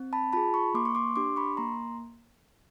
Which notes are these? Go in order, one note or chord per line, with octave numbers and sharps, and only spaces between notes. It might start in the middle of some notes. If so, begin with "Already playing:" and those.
Already playing: C4
A5 B5
F4 G#4 A5 B5
B5 C#6
A#3 C6 D6
C#6
C6 D6
D4 G4 C6 D6
B5 C#6
A#3 A#5 C6